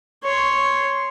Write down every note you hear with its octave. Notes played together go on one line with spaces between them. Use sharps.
C#5 C6